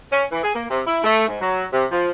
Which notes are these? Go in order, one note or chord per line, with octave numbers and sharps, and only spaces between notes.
C#4
E3
G#4
A#3
C3
E4
A3
G#2
F#3
C3
F3